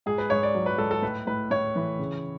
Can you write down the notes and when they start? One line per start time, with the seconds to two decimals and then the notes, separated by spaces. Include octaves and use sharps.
0.06 G#2 G#4
0.18 B4
0.30 G#2 C#5
0.43 D5
0.55 F#3
0.66 B4
0.78 G#2 A4
0.91 A4
1.02 A2 B4
1.27 A2 B4
1.50 A2 C#5
1.76 E3
1.99 C#3